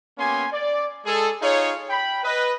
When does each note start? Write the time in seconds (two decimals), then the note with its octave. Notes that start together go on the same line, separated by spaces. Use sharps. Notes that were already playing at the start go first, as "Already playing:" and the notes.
0.18 A#3 B3 C#4 G4 G#5 C6
0.53 D5
1.05 G#3 G#4 A4
1.42 D#4 F4 G#4 C#5
1.90 G5 B5
2.24 B4 D#5